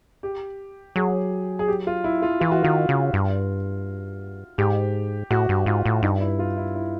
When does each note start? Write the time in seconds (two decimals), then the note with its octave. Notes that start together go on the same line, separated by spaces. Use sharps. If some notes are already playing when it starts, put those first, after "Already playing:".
0.23 G4
0.96 F#3 G#4
1.59 G#4
1.68 G4
1.87 F4
2.04 E4
2.22 F4
2.41 E3 F4
2.51 F#4
2.63 D#3 F4
2.89 C#3
3.13 G2 F4
4.58 G#2 G4
5.31 A2 F#4
5.49 G2
5.66 G#2 F4
5.85 A2
6.03 G2 D#4
6.21 E4
6.39 F4
6.57 E4
6.76 E4